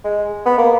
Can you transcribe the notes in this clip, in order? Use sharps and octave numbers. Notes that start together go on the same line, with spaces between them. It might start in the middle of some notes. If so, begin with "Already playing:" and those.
G#3
B3
A#3